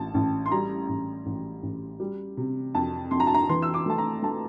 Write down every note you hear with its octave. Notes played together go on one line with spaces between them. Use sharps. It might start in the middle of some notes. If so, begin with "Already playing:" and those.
Already playing: A1 A5
A1
C6
G3 A#5
A1
A1
A1
G3
C3
F2 A5
F2 C6
A#5
A5
A#5
E3 C6
E6
D6
A3 A5
A#5
A3 A5